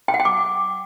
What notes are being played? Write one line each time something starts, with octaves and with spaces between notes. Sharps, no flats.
G5
F#5
G5
D6